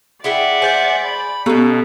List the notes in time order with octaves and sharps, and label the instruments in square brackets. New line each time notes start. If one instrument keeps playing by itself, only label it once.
[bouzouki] E4 G#4 G5 [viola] D5 [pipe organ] E5 F#5
[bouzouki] G#4 C5 [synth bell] G#5 G6 A6
[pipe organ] B5
[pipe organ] B2 [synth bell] B3 G4 [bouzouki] C#4 D#4 [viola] A4